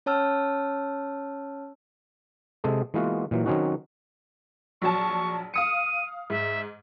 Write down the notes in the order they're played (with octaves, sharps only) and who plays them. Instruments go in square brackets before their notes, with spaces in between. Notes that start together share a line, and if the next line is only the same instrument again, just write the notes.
[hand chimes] C#4 C#5 A5 E6 F6
[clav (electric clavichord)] C3 G#3 G#4 A4
E3 G#3 A#3 B3 F4 F#4
A#2 E3 F#3
D#3 F#3 C4 C#4 D#4 F#4
[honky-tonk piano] A#1 F#3 A5 [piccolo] C#6
[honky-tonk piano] F5 D#6 C#7 [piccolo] D#7
[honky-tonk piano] G#2 [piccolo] E5